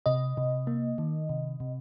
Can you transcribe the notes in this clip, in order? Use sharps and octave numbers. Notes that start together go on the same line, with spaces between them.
C3 D#5
C3
A#3
D#3
C3
C3